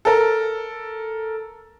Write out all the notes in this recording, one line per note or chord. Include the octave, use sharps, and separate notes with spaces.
A4 A#4